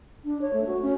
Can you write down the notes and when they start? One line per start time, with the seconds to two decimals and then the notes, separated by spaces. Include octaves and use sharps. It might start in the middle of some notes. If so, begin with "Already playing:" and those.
0.24 D4
0.41 C#5
0.53 A3
0.67 F#4
0.82 C#4